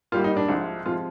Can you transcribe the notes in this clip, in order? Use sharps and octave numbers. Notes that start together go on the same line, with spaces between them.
G#2 G3 A#3 F4
D#4
D4
C2 C3 F3 G#3
C3 F3 G#3 F4